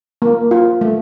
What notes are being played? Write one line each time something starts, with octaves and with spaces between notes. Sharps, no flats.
A#3
F4
A3